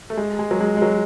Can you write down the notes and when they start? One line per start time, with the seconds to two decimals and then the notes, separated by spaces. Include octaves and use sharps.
0.10 A3
0.17 G#3
0.39 G#3
0.51 F#3
0.61 G#3
0.77 G#3
0.82 F#3